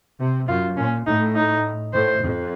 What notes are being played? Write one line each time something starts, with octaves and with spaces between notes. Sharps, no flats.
C3
F#2 F4
A#2 C#4
A2 D#4
D#4
A2 C5
F2